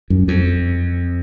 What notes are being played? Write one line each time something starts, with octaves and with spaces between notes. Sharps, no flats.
F#2
F2